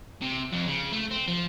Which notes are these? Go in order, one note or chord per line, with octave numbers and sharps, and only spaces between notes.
C3
F2
C#3
A3
C4
F3